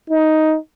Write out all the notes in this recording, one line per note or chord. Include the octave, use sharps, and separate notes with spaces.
D#4